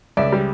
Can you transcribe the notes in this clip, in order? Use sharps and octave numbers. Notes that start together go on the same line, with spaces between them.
C#2 D5 E5
G3